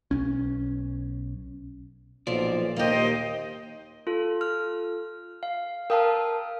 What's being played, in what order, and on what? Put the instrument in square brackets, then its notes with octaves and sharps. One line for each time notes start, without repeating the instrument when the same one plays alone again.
[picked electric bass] B1 C#4
[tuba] B1 [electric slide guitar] A#2 D5 [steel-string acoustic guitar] F3
[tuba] D#2 [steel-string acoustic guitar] A#3 G4 [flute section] C5 D#5 G5
[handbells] F4 A4
[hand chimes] F6
[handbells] F5
[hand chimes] A#4 F5 A5 [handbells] G5 D#6 F6